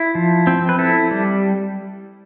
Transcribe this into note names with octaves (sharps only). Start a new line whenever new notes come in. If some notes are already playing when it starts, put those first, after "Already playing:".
Already playing: E4
F3
C4
B4
E4 A4
G3